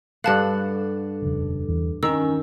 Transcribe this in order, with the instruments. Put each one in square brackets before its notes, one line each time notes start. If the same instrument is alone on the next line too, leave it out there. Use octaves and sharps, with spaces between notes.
[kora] G2 F#5 [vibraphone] A4 D6 [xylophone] F5 A5 F#6
[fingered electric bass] D#1 F2 C#3
E2 E3
[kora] D#3 [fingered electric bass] C4 [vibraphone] C#4 G#5 [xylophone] E6